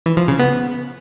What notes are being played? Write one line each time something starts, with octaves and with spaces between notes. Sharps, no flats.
E3
F3
C#3
B3